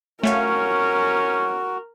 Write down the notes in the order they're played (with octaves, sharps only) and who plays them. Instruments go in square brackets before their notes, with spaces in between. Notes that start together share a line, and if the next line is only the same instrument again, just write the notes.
[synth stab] A3 C#5 F5 [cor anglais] C#4 [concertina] F#4 [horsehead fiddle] A#4